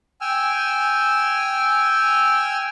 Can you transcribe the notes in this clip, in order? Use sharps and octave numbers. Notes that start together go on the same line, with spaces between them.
G5 G#5 E6 F6